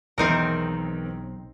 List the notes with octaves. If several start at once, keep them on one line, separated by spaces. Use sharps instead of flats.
B1 E2 D#3 C4 D#4 A#4